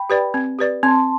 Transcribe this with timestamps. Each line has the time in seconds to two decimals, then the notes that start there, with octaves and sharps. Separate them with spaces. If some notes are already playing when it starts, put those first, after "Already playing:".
Already playing: G5 B5
0.10 G4 B4 D5
0.34 C4
0.59 G4 B4 D5
0.83 C4 A5 C6